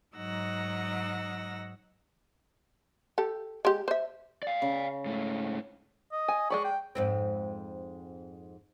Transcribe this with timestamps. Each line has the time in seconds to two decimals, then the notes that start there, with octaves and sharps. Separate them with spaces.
0.15 G#2 F#3 D#4 F#5 E6 A#6
3.18 G4 A4
3.65 G#3 G4
3.88 C5 E5
4.43 D5 F5
4.62 C#3
5.06 G#2 A3
6.12 D#5
6.28 G#5
6.50 G#3 D5 B5 C#6
6.65 G5
6.95 F2 G#2 C4